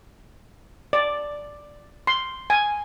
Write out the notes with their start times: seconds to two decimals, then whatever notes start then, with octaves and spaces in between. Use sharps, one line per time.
0.93 D5
2.07 C6
2.50 G#5